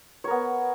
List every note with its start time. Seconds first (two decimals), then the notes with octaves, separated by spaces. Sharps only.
0.24 C#5
0.27 A#4
0.31 B3